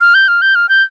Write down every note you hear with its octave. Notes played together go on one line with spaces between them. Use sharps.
F6
G6
F6
G6
F6
G6